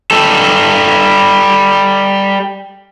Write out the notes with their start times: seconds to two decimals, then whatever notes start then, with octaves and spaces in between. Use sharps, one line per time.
0.11 G3 A4